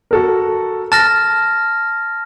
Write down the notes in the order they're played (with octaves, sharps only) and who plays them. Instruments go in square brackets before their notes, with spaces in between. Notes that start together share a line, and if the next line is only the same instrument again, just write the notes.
[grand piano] F#4 A4 A#4
[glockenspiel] A5 F6 A#6 [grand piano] A6